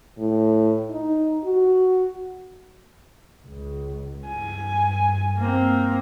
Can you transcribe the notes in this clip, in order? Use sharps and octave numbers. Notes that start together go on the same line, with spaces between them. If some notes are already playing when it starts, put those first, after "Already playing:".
A2
D#4
F#4
C#2
G2 G#5
A#3 C4